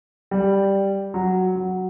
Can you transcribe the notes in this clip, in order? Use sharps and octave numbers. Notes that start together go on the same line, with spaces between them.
G3
F#3
F#3